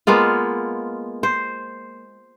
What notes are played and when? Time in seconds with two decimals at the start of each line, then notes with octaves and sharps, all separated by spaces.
0.07 G#3 A#3 B3 F4
1.23 C5